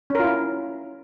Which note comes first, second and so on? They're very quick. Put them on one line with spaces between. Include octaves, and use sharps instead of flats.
C#4 A#4 F4 E4